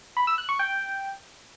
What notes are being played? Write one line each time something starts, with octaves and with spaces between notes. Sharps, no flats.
B5
E6
F#6
C#6
G5